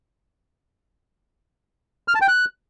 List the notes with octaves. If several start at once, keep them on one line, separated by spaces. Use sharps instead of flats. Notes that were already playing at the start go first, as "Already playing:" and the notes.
F6
A5
G5
F#6